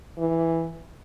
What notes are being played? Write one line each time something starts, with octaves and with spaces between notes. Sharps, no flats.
E3